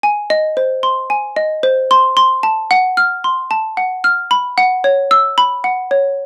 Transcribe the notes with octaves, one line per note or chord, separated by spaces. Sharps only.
G#5
D#5
C5
C6
G#5
D#5
C5
C6
C6
A5
F#5
F6
C6
A5
F#5
F6
B5
F#5
C#5
E6
B5
F#5
C#5